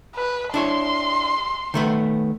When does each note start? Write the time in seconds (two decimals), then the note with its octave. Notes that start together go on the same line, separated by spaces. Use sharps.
0.16 B4
0.54 D4 E4 C#5 C6
1.74 D#3 A3 B3